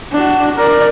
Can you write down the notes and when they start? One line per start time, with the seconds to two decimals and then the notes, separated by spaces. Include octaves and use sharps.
0.13 D4 F#4
0.56 A#4 D5